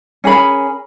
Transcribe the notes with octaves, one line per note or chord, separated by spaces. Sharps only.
C#4 G#4 A#4 B5